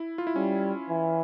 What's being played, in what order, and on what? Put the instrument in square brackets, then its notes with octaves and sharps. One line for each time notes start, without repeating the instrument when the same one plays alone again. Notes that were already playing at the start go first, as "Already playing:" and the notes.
Already playing: [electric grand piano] E4
F4
E4
[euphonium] G3 [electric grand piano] C#4
[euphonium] E3